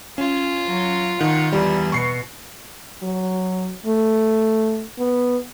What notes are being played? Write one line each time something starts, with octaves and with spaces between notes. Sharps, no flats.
C#4 F4
F#3
D#3 F#5
E2 G3 E4
B2 C#6 C7 C#7
F#3
A3
B3